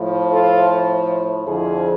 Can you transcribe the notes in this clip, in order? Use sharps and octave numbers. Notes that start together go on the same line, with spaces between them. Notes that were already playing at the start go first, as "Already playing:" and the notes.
Already playing: A2 F3
F4 A4
F2 D3 F3 E4 G#4